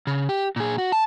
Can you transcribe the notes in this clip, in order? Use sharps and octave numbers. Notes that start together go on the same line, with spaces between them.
C#3
G4
A#2 G#4
F#4
A5